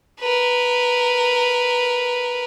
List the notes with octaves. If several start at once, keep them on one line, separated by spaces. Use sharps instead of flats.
A#4 B4